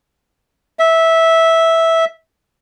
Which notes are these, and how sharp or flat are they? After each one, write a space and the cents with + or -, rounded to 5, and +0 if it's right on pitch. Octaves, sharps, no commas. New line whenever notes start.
E5 -10